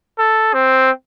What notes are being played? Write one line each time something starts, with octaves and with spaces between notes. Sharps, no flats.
A4
C4